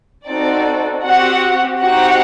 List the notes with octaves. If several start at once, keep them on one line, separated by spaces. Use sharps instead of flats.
C4 D#4 F#4 A4 D5
C4 F#4 G4 F#5
C4 D#4 F#4 G4 F#5